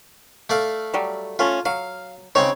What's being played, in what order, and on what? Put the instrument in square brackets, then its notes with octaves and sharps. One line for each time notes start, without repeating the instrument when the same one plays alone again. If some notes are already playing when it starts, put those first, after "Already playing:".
[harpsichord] A3 D5 F5
[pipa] F#3 G3
[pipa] A3 C#4 [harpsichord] F4
[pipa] F#3 [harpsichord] F5
[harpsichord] C#3 C4 D#4 [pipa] C#5